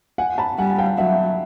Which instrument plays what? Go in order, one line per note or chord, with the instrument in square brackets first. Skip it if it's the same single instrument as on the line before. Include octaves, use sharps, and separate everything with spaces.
[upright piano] F#5 G#5
A5 B5
[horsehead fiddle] G3 [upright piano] F#5 G#5
[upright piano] F5 G5
[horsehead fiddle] F#3 [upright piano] E5 F#5